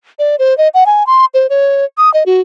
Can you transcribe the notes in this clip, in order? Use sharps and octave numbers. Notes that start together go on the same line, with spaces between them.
D5
C5
D#5
F#5
G#5
C6
C5
C#5
D#6
D#5
F#4